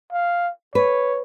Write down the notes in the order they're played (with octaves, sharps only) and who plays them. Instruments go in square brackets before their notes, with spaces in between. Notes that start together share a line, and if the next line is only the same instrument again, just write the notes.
[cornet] F5
[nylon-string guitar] B4 [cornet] C#5